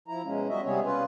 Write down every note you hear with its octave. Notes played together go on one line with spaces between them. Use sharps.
F3 E4 A#5
B2 G#3 C#4
G3 F#4 D#5 E5
C3 G3 B3 C4 G#4 C#5
C#4 F4 B4